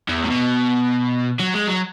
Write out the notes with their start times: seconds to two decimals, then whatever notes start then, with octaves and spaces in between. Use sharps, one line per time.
0.09 E2
0.24 A2
0.30 B2
1.40 F#3
1.55 G#3
1.68 F#3